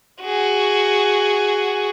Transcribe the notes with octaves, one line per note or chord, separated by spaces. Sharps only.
F#4 G#4